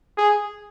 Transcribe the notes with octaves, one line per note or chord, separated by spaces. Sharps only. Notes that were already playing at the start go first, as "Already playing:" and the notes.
G#4